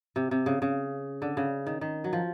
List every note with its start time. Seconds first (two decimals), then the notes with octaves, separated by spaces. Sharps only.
0.16 C3
0.31 C3
0.46 C#3
0.62 C#3
1.22 D3
1.37 C#3
1.67 D#3
1.81 D#3
2.04 F#3
2.13 F3